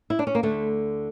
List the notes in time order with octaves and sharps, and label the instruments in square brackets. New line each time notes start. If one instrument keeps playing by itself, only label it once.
[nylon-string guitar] E4
D4
C#4
A#3
D2 D3 A3